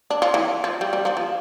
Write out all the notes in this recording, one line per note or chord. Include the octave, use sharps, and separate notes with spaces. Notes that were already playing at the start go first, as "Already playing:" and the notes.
D4
F3
E3
F3
G3
G3
F3
F3